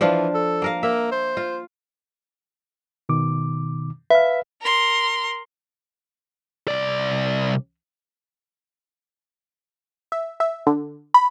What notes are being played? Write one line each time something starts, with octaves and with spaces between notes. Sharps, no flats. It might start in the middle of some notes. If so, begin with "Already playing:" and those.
E3 F3 D4 F4
A4
A#3 A#4 F5
A#3 E5
C5
F4
B2 D#3 D6
B4 E5 F5
A#4 C6
C2 D5
E5
E5
D3
B5